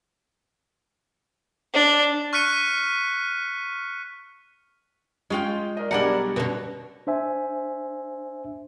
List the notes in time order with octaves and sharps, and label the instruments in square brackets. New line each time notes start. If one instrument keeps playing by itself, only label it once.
[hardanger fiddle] D4
[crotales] C#6 F6 F#6 B6 C#7 D#7
[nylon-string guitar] G#3 [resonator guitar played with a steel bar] C#4 F4 G5
[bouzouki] A3 D4 G5 [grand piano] A#4 D#5
[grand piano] B1 G3 F#7 [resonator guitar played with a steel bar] D4 G#4 A#4 [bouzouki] D5 [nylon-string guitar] F#5
[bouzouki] C#5
[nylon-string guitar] B2 D3 [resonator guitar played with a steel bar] C#4 F#4
[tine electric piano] D4 C5 E5 G#5